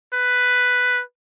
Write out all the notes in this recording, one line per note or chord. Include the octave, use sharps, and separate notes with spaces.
B4